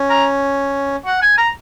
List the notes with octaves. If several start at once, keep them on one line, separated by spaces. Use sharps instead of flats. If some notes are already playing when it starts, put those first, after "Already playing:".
Already playing: C#4
A#5
F#5
G#5
A#5